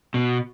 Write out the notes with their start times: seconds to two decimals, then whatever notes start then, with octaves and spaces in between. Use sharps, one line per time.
0.14 B2